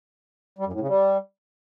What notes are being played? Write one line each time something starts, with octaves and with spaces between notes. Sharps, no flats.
G3
F#2
A2
C#3
G3